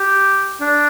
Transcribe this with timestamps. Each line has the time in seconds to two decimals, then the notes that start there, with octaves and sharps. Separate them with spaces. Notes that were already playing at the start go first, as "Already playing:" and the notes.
Already playing: G4
0.61 D4